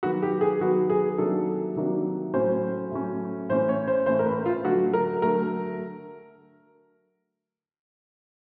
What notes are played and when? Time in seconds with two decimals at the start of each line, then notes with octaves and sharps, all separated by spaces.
0.03 D#3 F#3 B3 F#4
0.22 G4
0.41 G#4
0.60 D#3 F#3 B3 F#4
0.90 G#4
1.18 C3 D#3 F#3 A#3 D4 A4
1.76 C3 D#3 F#3 A#3 D4
2.34 A2 F#3 A3 C#4 C5
2.91 A2 F#3 A3 C#4
3.49 A2 E3 A3 C#4 C5
3.69 C#5
3.87 C5
4.06 A2 E3 A3 C#4 C5
4.19 A#4
4.26 B4
4.46 F4
4.65 D3 F#3 A3 F#4
4.93 A#4
5.22 D3 F#3 A3 A#4